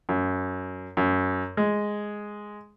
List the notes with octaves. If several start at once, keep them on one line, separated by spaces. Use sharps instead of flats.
F#2
F#2
G#3